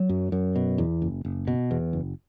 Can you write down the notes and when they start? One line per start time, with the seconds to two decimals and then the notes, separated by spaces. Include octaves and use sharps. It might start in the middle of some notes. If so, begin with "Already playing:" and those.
Already playing: F#3
0.09 F#2
0.32 F#2
0.56 B2
0.78 E2
1.02 F#1
1.25 F#1
1.47 B2
1.71 E2
1.93 F#1